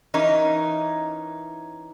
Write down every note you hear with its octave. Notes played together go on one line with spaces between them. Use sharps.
E3 C#4 D#4 A#4